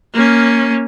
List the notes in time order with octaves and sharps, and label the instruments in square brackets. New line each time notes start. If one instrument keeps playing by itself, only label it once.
[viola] A#3 C#4